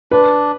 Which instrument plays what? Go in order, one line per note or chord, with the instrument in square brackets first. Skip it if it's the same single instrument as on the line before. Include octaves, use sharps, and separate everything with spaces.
[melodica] D4 [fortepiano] B4